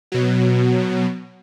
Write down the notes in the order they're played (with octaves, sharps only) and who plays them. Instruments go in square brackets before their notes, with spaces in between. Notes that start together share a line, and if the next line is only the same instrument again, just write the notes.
[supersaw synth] B2 F#3